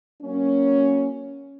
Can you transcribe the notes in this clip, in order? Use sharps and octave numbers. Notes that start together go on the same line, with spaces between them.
F#3 A#3 C#4